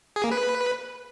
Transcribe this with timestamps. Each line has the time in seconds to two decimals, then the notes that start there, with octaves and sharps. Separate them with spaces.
0.16 G#4
0.24 A#3
0.32 B4